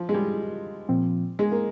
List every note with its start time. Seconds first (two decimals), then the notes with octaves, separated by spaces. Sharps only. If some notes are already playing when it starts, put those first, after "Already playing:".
Already playing: F3
0.09 G#3
0.14 G3
0.89 A#2 F3 C4
1.39 G#3
1.52 A#3